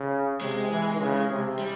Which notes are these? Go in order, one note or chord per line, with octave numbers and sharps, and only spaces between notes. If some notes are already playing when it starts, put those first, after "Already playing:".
Already playing: C#3
C3 G#3
E3
C#3
C3
G3